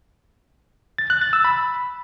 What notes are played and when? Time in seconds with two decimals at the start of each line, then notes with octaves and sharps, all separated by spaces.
0.98 A6
1.10 F#6
1.21 A6
1.33 E6
1.45 B5